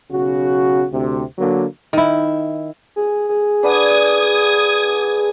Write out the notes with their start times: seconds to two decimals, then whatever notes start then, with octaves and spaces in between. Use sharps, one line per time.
0.10 B1 C#3 F#4
0.92 D2 C3
1.39 D3 F#3 A#3
1.93 D#3 E4
2.96 G#4
3.29 G#4
3.63 D4 B4 F#5 D#6 G#6